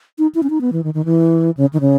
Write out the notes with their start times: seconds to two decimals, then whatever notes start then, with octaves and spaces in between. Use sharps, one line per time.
0.18 D#4
0.35 E4
0.43 C#4
0.50 D#4
0.61 B3
0.73 E3
0.84 D#3
0.94 D#3
1.05 E3
1.57 C#3
1.73 D#3
1.81 C#3